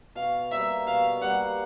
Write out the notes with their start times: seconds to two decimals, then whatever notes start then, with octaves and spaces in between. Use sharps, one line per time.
0.15 B2 F5
0.51 G3 A#3 E5
0.87 B2 F5
1.21 G3 A#3 F#5